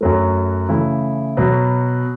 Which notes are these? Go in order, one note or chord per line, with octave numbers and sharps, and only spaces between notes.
F#2 F#3 A3
C#3 E3 A3 E4
B2 F#3 B3